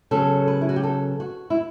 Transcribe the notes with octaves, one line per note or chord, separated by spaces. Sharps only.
C#3 F#3 B3 A4
B4
E4
F#4
G4
A4
F#4
E4